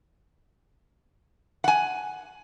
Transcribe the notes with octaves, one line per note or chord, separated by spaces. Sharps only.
F#5 G#5